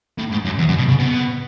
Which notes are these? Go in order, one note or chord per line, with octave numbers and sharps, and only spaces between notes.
A2
G#2
F#2
E2
F#2
B2
C#3
B2